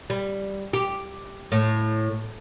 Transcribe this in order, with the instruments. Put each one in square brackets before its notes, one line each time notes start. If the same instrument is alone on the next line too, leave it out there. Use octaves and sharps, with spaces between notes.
[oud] G3
G4
A2